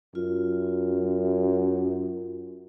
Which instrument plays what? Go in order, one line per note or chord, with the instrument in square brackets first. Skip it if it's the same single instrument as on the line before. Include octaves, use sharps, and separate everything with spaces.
[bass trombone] F#2 [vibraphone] F4